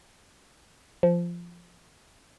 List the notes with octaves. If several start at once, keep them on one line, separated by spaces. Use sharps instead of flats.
F3